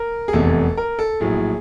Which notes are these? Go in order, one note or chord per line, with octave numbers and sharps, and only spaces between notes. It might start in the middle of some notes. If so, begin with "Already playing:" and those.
Already playing: A#4
G#4
F1 E2 C3 E3 A4
A#4
A4
A#1 A2 F#3 G#4